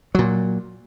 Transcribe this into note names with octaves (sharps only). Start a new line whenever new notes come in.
A#2 F#3